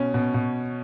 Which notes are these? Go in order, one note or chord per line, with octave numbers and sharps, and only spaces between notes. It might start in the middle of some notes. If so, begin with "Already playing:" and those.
Already playing: B2 C#4
B2
B2